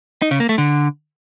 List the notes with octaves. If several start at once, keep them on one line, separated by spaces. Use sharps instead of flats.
D#4
C#3
A#3
A3
D3